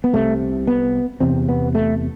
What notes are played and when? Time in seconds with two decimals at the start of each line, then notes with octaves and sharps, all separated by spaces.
0.04 B3
0.13 C2 C3 A3
0.67 B3
1.20 E2 C3 C4
1.49 B3
1.75 A3